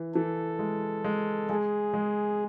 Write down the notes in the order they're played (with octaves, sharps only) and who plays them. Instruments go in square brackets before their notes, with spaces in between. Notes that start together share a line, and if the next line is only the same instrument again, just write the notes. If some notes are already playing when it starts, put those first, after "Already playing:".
Already playing: [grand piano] E3
[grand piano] E3 [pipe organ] A4
[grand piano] G#3
G#3
[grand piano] G#3 [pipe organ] G#4
[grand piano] G#3